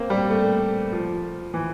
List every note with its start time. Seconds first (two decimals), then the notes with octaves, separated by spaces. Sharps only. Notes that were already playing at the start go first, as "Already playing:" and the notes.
Already playing: A#3 C4
0.10 G3
0.30 A3
0.92 F3
1.54 E3